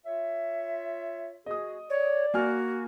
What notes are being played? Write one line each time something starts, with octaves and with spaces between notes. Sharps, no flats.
F4 C#5 E5
F#4 G#4 D#5 D#6
C#5 D5
A#3 F#4 G#5 F6